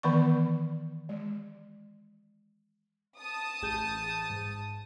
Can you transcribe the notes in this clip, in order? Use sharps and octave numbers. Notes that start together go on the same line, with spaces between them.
D#3 E3 B3 D5 C#6
G#3
A5 D#6
A1 G#4 G6
G#2